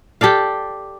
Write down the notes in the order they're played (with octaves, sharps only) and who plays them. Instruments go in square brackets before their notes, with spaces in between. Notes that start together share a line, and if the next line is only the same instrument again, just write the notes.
[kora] G4 A4 D5 F5